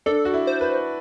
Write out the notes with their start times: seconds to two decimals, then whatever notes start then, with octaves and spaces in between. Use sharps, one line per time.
0.06 D4 A4
0.25 F#4
0.34 E4
0.47 C5
0.61 B4